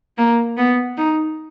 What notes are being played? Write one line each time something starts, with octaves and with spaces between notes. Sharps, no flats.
A#3
B3
D#4